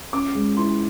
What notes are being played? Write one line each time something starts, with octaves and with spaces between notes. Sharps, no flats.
C#4 D6
G#3
E4 C6